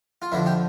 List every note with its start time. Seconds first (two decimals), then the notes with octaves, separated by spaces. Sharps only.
0.22 F4
0.32 F2 D3 F3 E4
0.46 G4